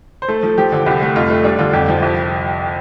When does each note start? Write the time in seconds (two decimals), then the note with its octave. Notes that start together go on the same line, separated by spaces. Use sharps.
0.22 C5
0.28 A3 A4
0.43 F3
0.58 F3 G4
0.72 D3
0.86 C2 G4
1.01 A3
1.16 F2 F4
1.30 A3
1.44 G3 D4
1.59 D3 F4
1.73 F2 G4
1.88 F3
2.02 C2